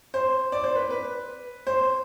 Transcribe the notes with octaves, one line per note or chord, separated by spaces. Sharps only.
C5
D5
C5
B4
B4
C5